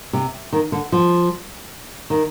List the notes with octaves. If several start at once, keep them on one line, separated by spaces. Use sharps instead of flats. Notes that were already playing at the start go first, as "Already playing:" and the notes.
C3
D#3
D3
F3
D#3